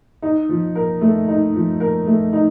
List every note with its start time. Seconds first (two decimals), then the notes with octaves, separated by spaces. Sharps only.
0.22 D#4
0.49 F3
0.75 A#4
1.01 A3
1.28 D#4
1.55 F3
1.80 A#4
2.06 A3
2.33 D#4